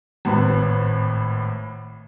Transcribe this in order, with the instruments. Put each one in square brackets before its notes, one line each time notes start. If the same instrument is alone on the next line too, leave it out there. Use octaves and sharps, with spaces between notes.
[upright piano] G#1 A2 B4